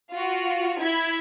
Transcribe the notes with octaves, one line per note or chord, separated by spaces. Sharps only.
F4 F#4
E4 G#6 B6